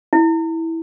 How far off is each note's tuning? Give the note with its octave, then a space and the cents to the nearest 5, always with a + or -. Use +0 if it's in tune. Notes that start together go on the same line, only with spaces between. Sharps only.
E4 -10